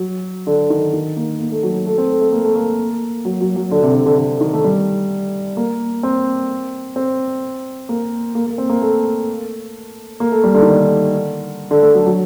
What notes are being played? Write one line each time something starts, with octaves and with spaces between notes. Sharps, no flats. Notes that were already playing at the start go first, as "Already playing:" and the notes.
Already playing: F#3
D3
D#3
D#3
A#3
A#3
A3
F#3
A3
C4
A3
A3
A#3
A3
A#3
F#3
F#3
F#3
D3
C3
D3
D3
D3
D#3
A3
G3
A#3
C4
C4
A#3
A#3
A#3
C4
A#3
A3
A#3
A3
G3
D3
D#3
D3
D3
A3
F#3
F#3